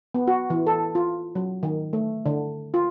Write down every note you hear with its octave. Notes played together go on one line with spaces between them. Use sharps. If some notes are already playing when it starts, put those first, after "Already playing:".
B3
F#4
E3
A4
F4
F#3
D#3
A3
D3
F4